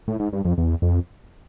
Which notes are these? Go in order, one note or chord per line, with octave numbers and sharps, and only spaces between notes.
A2
G#2
G2
F2
E2
F2